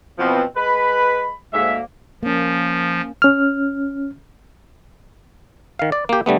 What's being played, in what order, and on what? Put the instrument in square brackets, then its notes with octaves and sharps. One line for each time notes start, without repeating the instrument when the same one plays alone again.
[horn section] B2 F3 [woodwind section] E3 B3 C4
[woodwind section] G#3 B5 [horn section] B4
[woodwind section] D2 A#3 [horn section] G#2 E5
[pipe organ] F3 [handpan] A#3 C#4
[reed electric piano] C#4 F6
[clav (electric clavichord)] D#3 F5
D5
A#3 G4
D3 G3 A3 B3